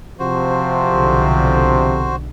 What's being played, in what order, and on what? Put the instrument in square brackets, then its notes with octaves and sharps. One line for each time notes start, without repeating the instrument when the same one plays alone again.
[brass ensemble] C3 F3 [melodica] F#4 C5
[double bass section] B1 D3